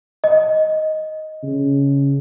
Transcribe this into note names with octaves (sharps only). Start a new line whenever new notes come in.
D#5
C#3